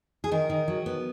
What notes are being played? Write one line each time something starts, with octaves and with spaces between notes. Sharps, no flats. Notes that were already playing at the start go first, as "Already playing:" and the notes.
G#4
D#3 A#4
D#3
F#3
B3